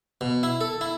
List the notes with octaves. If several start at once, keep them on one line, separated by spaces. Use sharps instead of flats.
B2
E4
A4
E4